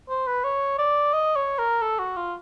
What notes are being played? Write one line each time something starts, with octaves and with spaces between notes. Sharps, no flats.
C5
B4
C#5
D5
D#5
C#5
A#4
A4
F#4
F4